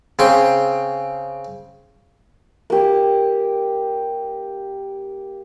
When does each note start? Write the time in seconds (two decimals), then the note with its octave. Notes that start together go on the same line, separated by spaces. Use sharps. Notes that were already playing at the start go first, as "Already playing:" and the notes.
0.19 C#3 C4 C6
2.70 A#3 G4